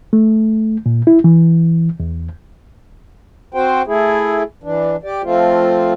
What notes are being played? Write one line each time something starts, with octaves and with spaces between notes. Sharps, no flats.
A3
A#2
E4
E3
E2
C4 F#4 C5 G5
A3 E4 G#4
E3 D4
G4 D5
F3 A3 C4 F4